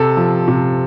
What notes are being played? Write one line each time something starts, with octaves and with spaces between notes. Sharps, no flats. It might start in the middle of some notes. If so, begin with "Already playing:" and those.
Already playing: C3 A4
F3
C3